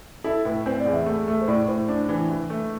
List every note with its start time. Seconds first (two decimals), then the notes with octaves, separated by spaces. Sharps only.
0.24 E4 A4
0.45 A2 B4
0.66 C4 C5
0.80 D5
0.86 E2
0.93 E5
1.06 A3
1.28 A3
1.41 C5
1.48 A2 D5
1.68 A2 C5
1.88 D4
2.09 E3
2.30 E3
2.50 A3